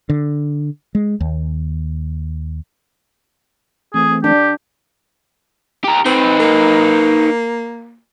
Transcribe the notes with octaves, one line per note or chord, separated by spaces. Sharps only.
D3
G#3
D#2
E3 A3 C4 G#4
D4 G4
G4 A#4
C4 D#4 B4
A#3